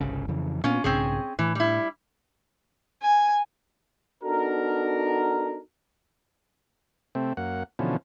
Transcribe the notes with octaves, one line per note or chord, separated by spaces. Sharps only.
G1 C2 C#3
F2 C#3 E3
A#2 A#3 B3 C#4 F4
B1 G#2 C#3 C4 C#4 G#4
A2 E3
G3 E4
G#5
B3 D4 D#4 F#4 A4 A#4
C3 A3 C4
F#2 A#3 F#5
B2 D3 E3 F3 C#4